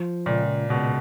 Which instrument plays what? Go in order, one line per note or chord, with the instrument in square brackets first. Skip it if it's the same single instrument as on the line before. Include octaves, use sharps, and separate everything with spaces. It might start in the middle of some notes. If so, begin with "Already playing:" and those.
Already playing: [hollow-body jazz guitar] F3
[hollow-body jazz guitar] C#2 [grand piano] A#2
[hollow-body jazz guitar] C#2 [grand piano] B2